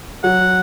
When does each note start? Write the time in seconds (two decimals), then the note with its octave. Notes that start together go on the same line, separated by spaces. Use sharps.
0.23 F#3 F#5